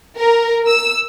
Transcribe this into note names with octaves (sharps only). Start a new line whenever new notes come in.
A#4
E6